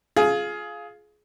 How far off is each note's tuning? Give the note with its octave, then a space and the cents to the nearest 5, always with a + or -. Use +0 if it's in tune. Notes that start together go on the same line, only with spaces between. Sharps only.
F4 +0 G#4 +20